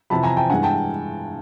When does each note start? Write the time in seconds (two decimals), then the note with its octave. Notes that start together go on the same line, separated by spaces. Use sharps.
0.10 F2 C3 E3 A5 B5
0.23 G#5 A#5
0.37 G5 A5
0.50 G2 E3 G#3 F#5 G#5
0.63 G5 A5